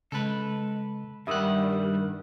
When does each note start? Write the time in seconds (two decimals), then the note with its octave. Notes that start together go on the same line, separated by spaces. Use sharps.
0.12 C#3 G#3 A4 B4 A5
1.27 G2 D#3 G3 A#4 E5 F#5 D#6 E6